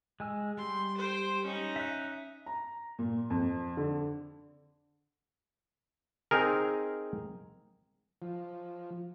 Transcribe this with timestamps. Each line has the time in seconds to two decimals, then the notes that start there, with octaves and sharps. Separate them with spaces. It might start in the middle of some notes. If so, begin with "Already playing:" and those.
0.20 G#3 G#5 E6
0.57 G3 C6
0.98 C5 G5
1.45 C#4 D#4
1.76 E5 F#6
2.46 A#5
2.99 A#2
3.30 F2
3.77 D3
6.31 C4 D#4 G#4 A#4
8.22 F3